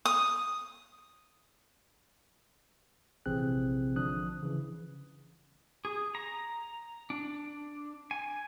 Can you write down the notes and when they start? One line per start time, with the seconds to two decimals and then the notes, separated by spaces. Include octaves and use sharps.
0.05 D#6
3.26 A#1 C3 E3 C4 G#4 F#6
3.96 D3 F3 D4 D#6 F#6
4.43 C#3 E3
5.85 G#4
6.15 A#5
7.10 D4
8.11 G#5